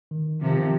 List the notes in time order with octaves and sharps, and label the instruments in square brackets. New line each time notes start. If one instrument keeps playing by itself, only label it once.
[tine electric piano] D#3
[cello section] C3 F3 [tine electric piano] D#3